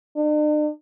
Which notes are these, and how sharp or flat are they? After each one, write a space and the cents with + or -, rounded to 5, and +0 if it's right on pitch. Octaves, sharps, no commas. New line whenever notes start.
D4 +45